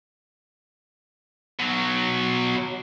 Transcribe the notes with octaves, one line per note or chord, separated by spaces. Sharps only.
B2 F#3